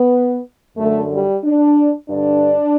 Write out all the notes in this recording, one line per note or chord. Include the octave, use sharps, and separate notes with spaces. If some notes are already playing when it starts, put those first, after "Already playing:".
Already playing: B3
F#2 D3 A3
G3
D4
G2 D3 D4